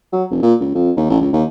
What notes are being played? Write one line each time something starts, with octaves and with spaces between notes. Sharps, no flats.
F#3
F1
A#2
C#2
F2
D#2
A1
C#2
D#2